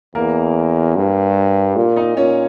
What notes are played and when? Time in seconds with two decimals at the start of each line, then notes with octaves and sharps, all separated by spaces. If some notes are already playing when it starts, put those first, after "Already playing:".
0.15 E2 A#3 A#4
0.96 G2
1.76 A#2
1.96 D#4 D#5
2.17 A#2 C#4 C#5